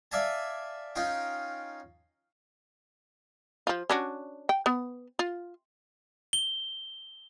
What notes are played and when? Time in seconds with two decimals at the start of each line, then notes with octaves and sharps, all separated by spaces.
0.12 D5 E5 F5 G#5 A5
0.96 C#4 D#4 F4 F5 G5
3.67 F3 F4
3.90 C#4 D4 F#4
4.49 G5
4.66 B3
5.19 F4
6.33 G7